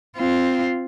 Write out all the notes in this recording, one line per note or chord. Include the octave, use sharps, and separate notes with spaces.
C4 F4